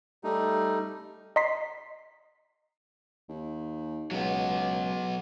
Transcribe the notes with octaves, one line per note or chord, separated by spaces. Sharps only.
G3 A3 D#4
D#5 A#5 C6 B6 C7
D#2
C#2 F#3 B3